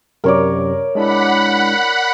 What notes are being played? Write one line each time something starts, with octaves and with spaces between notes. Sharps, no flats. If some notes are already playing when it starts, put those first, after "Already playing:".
F#2 C3 A#4 C#5 D5
G#3 D4 E4 F#5 B5